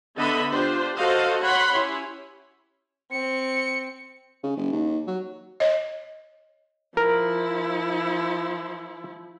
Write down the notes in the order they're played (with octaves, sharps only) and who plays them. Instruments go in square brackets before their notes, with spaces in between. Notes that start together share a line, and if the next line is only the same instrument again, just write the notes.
[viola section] D3 B3 A4 D#5 E5 B5
D4 F4 G4 C5
F#4 A4 C5 D#5 F5
C#5 F#5 B5 C6
C#4 E4 G4 C#5
[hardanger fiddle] C4 [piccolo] C#7
[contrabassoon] C#3
F#1
D#2
F#3
[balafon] C#5 D#5
[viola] F3 E4 [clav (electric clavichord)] A#4